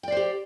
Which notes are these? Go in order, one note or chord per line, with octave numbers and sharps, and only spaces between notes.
G4 C5 D5 G5